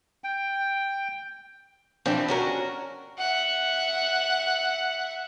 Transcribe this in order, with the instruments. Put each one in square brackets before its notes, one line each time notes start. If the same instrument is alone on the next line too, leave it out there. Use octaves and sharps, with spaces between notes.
[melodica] G5
[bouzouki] E3 C4 [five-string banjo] F3 D4 G4
[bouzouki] C#4 F#4 A#4
[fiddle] E5 F#5